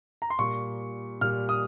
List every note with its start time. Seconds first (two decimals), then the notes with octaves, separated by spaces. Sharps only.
0.22 A#5
0.30 C6
0.39 A#2 G3 C#6
1.21 A#2 G3 F6
1.49 D#6